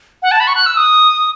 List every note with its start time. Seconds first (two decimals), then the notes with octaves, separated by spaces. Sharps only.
0.23 F#5
0.31 A5
0.40 B5
0.47 C#6
0.55 F#6
0.66 E6
0.77 D#6